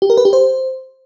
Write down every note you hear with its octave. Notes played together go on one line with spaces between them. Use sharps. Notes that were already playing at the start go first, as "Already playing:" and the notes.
G4
A#4
B4
G4
C5